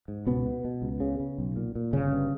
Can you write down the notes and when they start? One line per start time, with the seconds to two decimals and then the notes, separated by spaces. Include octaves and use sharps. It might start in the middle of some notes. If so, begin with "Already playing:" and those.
0.08 G#2
0.27 C#2 B2 B3
0.46 B2
0.65 B2
0.82 C#2
1.00 C#3
1.20 C#3
1.38 B1
1.56 A#2
1.75 A#2
1.93 G1 C#3 C#4
2.12 G2